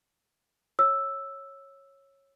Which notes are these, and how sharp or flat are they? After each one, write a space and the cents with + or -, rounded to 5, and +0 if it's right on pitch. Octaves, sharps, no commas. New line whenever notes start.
C#5 -15 E6 +0